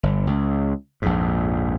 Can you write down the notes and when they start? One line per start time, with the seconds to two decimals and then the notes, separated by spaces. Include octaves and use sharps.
0.03 G1
0.27 C#2
1.02 A#1 F2 G#2